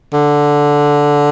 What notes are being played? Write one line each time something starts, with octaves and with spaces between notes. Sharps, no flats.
D3